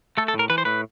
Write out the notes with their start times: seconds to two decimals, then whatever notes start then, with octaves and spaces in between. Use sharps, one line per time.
0.17 A3 A4
0.28 A4
0.34 A2 A#4
0.50 E3 B4
0.58 C5
0.65 A2 B4